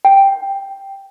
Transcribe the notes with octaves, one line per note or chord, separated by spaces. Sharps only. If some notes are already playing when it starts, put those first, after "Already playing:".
G5